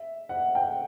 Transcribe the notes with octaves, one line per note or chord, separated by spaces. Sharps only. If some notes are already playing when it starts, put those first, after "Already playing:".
Already playing: E5
F#5
G5